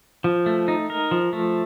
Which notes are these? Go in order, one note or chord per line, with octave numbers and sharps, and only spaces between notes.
F3
A3
D#4
A#4
F3
A3